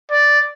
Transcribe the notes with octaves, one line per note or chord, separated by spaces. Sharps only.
D5